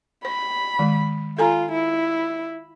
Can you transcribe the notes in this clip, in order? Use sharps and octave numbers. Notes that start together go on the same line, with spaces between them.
C5 B5
D#3 G#3
F4 A4 G#5 A#5
E4